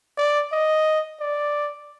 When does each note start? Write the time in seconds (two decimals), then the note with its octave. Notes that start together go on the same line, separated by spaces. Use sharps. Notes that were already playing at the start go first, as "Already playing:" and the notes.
0.18 D5
0.52 D#5
1.20 D5